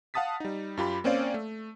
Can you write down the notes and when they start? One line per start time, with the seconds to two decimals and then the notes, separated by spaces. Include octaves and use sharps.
0.14 F5 F#5 A5 D#6 A6 B6
0.40 G3 D#4
0.77 F#2 F4 G4 B5
1.04 A#3 C4 C#4 C5 D5 F5
1.34 A3